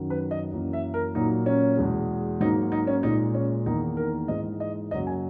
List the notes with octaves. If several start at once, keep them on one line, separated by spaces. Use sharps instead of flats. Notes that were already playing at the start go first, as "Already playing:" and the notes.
Already playing: F#2 D#3 F#3
B4
D#5
F#2 E3 A#3
E5
A#4
A#2 F#3 A#3 D#4
C#4
E2 B2 G#3
G#2 F#3 A#3 D#4
D#4
C#4
A#2 G#3 D#4
C#4
E2 D#3 A#3 D#4
A#4
G#2 E3 G#3 D#5
D#5
F#2 C#3 F#3 A#3 D#5
G#5